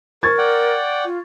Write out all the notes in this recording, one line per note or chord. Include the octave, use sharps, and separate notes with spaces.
A#4 C#6 G#6 A6
D5 F#5 G5
F4